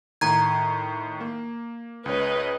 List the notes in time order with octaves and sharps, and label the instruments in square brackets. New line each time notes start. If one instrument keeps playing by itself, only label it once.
[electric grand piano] A2 D#3 [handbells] A#5 G#6
[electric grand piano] A#3
[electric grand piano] C#2 C#5 [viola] B4 D#5